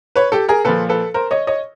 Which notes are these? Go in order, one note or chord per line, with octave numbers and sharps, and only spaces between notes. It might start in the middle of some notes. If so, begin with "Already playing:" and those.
B4 C#5
G4 A4
G#4 A#4
A#2 F3 A4 B4
A4 B4
A#4 C5
C#5 D#5
C#5 D#5